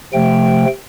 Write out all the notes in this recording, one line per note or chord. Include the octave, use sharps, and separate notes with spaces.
C3 F3 A3 G5